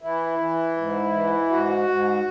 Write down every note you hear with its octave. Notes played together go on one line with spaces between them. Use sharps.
E3 E4
E3
G#2
E3
G#2 F#4
G#2